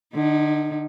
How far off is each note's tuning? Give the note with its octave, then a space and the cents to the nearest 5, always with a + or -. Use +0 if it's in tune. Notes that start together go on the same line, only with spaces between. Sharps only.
D3 +35 D#4 +5